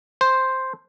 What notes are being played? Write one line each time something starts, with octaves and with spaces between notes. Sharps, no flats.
C5